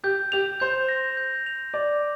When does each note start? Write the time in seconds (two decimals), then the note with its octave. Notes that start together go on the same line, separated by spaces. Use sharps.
0.04 G4 G6
0.32 G4 F7
0.60 C5 G6
0.89 A#6
1.17 G6
1.46 F7
1.74 D5 D6